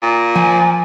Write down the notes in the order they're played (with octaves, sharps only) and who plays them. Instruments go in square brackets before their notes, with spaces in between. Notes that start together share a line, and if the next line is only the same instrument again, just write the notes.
[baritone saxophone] A#2
[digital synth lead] F3 [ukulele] G#5